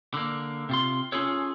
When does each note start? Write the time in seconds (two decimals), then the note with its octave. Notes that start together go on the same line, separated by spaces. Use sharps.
0.14 D3 A#3
0.69 C3 F4 C6
1.12 C#4 F4 G#4 A4 C#5